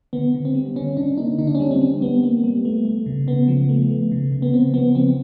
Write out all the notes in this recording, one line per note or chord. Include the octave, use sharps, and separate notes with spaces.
D3 B3
D3
C4
G3
D3 C#4
D3 D4
A#3 D#4
D3 D#4
D4
C#4
G3 D4
C4
G3
G3 B3
A#3
G3
A3
A3
C#3
C#3 B3
F3
A3
A3
C#3
C#3
B3
C#3 C4
F3 B3
F3 C4